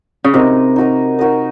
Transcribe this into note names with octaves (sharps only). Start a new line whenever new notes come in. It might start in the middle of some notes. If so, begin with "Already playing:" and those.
C#3
C3 D#4 F#4 A#4 D#5
D#4 F#4 A#4 D#5
D#4 F#4 A#4 D#5